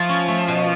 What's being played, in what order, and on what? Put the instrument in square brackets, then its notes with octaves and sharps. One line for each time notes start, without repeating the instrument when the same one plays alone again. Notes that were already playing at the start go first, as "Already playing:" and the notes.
Already playing: [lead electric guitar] F3 [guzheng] A3 F4
[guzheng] C#4
A3
B2